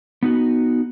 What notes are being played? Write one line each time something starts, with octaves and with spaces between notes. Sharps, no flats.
B3 D#4 F#4